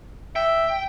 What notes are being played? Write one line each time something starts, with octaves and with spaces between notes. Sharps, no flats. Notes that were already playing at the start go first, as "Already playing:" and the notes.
E5 G5